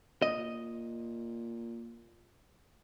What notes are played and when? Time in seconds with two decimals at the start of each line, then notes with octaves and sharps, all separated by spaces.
0.22 A#2 D#5